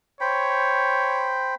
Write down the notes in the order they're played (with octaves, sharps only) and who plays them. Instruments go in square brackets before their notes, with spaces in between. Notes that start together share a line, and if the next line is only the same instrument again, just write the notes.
[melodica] C5 G5 B5 [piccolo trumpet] C#5